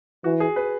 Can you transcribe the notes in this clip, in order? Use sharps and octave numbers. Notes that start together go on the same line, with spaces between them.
E3 F#4
G#4
B4